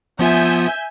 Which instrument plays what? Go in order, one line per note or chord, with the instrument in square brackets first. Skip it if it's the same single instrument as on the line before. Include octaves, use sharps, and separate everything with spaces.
[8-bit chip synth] F3 B3 F4 [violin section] E5 G#5 G6